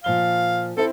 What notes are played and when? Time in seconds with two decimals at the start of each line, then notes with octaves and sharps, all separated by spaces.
0.04 A#2 F3 F5 G7
0.77 C4 E4 A4